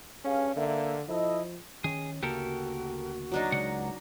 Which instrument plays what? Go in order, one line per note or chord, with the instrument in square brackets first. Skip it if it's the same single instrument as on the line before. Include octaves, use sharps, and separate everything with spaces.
[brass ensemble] G2 G#4 F5 [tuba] C#4
[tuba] D3 [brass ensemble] A#3 E5
[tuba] F3 [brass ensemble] E4 A4 D#5
[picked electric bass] D#3 C#4 [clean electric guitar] G#4
[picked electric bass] D2 C#3 A#3 [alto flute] F#4 [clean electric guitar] G4 A4 A#4
[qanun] F#3 D4 D#4
[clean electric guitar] C#2 F#5 [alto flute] D5